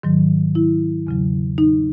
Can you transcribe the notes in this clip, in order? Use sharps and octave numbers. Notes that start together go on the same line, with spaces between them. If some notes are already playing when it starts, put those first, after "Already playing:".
G#2 D#3 F#3
E4
E2 C#3 F#3
D#4